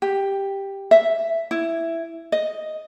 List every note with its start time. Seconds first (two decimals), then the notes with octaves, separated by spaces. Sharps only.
0.02 G4
0.91 E5
1.51 E4
2.32 D#5